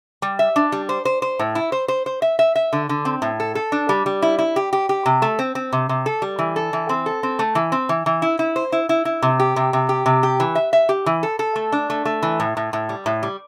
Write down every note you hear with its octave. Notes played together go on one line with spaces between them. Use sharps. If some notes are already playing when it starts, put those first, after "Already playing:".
G3
E5
D4
G3
C5
C5
C5
A2
E4
C5
C5
C5
E5
E5
E5
D3
D3
C4
A2
A4
A4
D4
G3
G3
E4
E4
G4
G4
G4
C3
A3
C4
C4
C3
C3
A4
G3
E3
A4
E3
C4
A4
C4
A3
E3
C4
E3
E3
E4
E4
C5
E4
E4
E4
C3
G4
C3
C3
G4
C3
G4
E3
E5
E5
G4
E3
A4
A4
A3
D4
A3
A3
E3
A2
A2
A2
G3
A2
G3